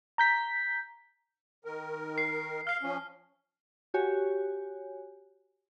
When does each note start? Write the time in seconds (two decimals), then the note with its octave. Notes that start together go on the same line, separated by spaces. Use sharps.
0.18 A#5 G6 B6
1.65 D#3 A#4
2.18 C7
2.67 F5 F6 C7
2.82 F3 C#4
3.94 F#4 G4 C#5 G#5